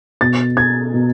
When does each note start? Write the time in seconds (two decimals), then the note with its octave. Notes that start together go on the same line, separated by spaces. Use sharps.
0.21 B2 A6
0.57 G#6
0.94 B2